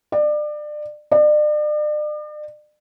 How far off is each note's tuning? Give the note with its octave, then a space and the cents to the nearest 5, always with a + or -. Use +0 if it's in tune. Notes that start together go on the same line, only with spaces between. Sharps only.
D5 +30
D5 +40